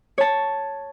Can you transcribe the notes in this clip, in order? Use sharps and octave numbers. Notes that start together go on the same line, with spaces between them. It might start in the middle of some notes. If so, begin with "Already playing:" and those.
C#5 A5